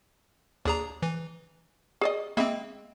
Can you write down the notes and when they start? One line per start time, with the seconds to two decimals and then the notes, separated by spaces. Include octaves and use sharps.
0.65 D#2 D4 G#4 A#5
1.02 E3
2.01 G#4 D5 D#5
2.37 G#3 A#3 C4 E5 B5